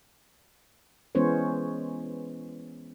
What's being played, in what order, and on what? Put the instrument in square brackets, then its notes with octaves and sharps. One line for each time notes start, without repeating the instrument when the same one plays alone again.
[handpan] E3 G#3 B3 C#4 C5 C#5